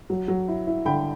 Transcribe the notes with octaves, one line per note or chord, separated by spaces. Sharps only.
F#3
F#3
E4
E4
D3 G5 B5